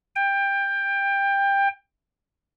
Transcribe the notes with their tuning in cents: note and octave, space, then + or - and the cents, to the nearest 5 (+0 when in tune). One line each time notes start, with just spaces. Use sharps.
G5 +20